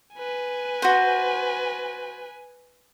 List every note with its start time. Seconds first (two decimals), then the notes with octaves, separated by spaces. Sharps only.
0.15 B4 G#5
0.82 F#4 C5